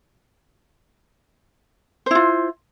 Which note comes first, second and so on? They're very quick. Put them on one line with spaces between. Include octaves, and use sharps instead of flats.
C5 E4 F4